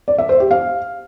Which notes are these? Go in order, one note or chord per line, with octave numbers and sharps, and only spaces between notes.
D5
E5
C5
G4
F5